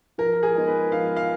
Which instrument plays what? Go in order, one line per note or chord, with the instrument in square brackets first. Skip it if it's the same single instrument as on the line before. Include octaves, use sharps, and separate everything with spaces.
[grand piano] F3 [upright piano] A#4
[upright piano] G#4
[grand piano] G#3 B3 D#4
[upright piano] B4
[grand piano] F3 [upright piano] F5
[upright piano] F5